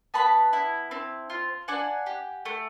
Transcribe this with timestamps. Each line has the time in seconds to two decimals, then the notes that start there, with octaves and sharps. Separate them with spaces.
0.14 B3 A5 B5
0.53 E4
0.91 C4
1.30 F4
1.68 D4 F#5 G#5
2.06 G4
2.45 A3